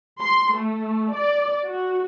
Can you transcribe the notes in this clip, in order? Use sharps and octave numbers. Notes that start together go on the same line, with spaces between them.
C6
A3
D5
F#4